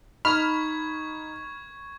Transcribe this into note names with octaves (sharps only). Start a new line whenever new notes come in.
D#4 B5 C#6 F6 G#6